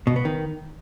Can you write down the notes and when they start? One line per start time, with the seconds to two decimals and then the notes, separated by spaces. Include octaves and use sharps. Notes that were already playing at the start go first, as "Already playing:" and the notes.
0.07 B2
0.16 B3
0.25 D#3